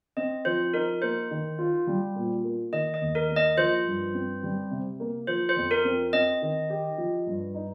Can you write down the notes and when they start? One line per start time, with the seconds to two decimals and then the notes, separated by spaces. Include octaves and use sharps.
0.17 C4 D#5
0.45 F3 C5
0.73 D#4 A#4
1.02 A#3 C5
1.31 D#3
1.58 F4
1.87 G3
2.15 A#2
2.44 A#3
2.72 D#3 D#5
2.94 D#5
3.01 D#2
3.15 A#4
3.29 A#3
3.36 D#5
3.57 F3 C5
3.86 G2
4.14 C4
4.43 G3
4.71 C3
5.00 A#3
5.27 F3 C5
5.49 C5
5.57 F2
5.71 A#4
5.84 C4
6.13 C4 D#5
6.42 D#3
6.70 G4
6.98 F3
7.27 G2
7.54 D#4